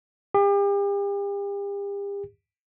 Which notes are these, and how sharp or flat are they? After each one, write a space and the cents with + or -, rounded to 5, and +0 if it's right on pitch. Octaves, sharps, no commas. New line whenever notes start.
G4 +40